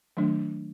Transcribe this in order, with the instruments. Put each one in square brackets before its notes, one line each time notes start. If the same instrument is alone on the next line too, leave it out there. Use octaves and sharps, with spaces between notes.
[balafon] D#3 F#3 A3 D4